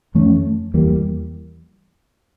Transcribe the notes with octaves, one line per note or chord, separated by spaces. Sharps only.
F2 E3 A3 C#4
E2 E3 G3 A#3